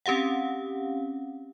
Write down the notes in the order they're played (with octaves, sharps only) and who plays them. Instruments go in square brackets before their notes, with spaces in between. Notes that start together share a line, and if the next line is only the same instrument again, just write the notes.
[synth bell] C4 C#4 G4 F5 F#5